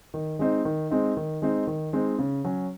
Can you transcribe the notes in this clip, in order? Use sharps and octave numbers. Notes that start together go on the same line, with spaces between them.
D#3
G#3 C4 D#4
D#3
G#3 C4 D#4
D#3
G#3 C4 D#4
D#3
G#3 C4 D#4
C#3
F#3 C#4